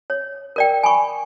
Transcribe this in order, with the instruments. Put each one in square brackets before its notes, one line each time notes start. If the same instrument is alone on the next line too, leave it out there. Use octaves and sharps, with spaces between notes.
[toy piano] C#5
A#4 D5 G5
G#5 B5 C#6